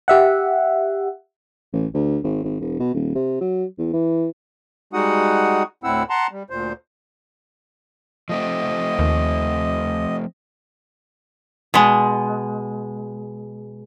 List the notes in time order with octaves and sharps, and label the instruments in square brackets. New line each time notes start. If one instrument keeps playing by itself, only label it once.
[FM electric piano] G4 E5 F#5
[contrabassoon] A1
D2
G#1
G#1
E1
B2
D#1
C3
F#3
E2
E3
[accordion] G3 G#3 D#4 F#4 F#5 D#6
D2 A2 C4 E4 F#5 E6
F#5 A5 A#5 C6
G3
D2 A#2 C5
[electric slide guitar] F3 A3 C4 [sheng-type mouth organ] D#5
[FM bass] D#2
[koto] B2 G#3